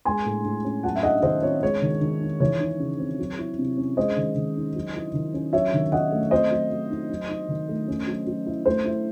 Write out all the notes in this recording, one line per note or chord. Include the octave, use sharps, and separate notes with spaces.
G#3 G#5 C6
A2
A2
C#4
F#3 F#5 A5
E5
D#4 D#5 F#5
D#3 C5 D#5
C4 C#5
G#3 C#5
D#3
D#3
D#4
E3 C#5
D#4
C#3
C4
F#3
E4
C3
C#4
G#3 C5 D#5
D#3
D#3
D#4
F#3
E4
D#3
C#4
F#3 C#5 E5
D#3
D#3 D#5 F#5
A3
C4 C5 D#5
F#3
F#3
D#4
F#3
D#4
D#3
A3
C#4
F#3
F#3
E4
A3 C5
E4